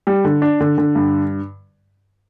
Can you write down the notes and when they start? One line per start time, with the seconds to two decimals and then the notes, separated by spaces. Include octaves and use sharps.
0.07 G3
0.25 D3
0.42 D4
0.60 D3
0.78 D3
0.95 G2